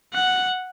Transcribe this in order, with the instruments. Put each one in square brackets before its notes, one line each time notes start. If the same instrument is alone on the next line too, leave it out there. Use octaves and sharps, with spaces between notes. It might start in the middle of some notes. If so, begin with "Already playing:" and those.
[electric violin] F#5